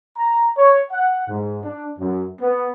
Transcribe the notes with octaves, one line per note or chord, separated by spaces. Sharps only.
A#5
C#5
F#5
G#2
D4
F#2
B3